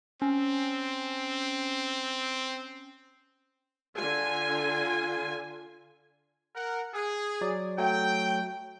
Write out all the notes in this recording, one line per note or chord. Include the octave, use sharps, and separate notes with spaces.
C4 C#4
D3 F4 G#5
A#4 F#5
G#4
F#3 D5
F#3 A3 G5